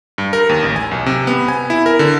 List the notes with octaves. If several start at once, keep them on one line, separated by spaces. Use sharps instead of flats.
G2
A#4
D#2
A1
G#5
B1
C3
B3
G#5
E4
A#4
D3